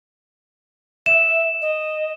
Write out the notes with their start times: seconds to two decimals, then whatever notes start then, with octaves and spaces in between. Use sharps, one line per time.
1.06 E5 E7
1.62 D#5